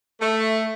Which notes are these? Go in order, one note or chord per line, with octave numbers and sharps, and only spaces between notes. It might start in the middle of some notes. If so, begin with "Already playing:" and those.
A3